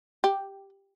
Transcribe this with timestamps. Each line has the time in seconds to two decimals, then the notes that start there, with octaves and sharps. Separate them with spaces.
0.24 G4